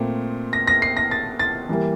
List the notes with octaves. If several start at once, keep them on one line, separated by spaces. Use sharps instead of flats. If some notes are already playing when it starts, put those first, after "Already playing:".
Already playing: A#2 A3 C4
A#6
A#6
C7
A#6
A6
A6
E3 G3 A#3